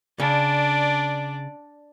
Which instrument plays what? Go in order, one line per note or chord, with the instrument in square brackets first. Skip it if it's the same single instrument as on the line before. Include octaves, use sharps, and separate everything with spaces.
[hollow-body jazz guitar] C#3 [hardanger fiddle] D4 D5